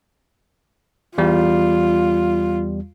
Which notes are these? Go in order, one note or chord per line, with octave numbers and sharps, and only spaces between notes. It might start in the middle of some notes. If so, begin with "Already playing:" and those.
E2 G3 F4